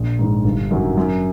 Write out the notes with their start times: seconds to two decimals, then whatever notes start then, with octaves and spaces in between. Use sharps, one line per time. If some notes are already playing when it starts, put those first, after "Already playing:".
Already playing: A#1
0.19 G#2 D#3
0.44 G1
0.71 F#2 D#3 F#3
0.97 F#2